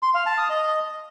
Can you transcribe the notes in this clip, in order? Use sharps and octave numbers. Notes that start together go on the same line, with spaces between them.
C6
F5
A5
D#6
D#5